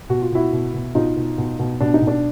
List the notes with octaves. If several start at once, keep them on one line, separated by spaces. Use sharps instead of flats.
B2 F#4
F4
B2 E4 F#4
B2
B2
B2 D#4 F4
B2
B2
B2
B2 D4
D#4
B2
D4